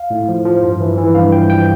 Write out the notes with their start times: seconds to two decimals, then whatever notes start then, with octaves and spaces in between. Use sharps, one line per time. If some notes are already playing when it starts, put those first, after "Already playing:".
Already playing: F5
0.10 A2
0.28 F3
0.45 F3
0.63 G2
0.80 E3
0.98 E3
1.15 G2 F5
1.32 F3 G5
1.50 F3 G5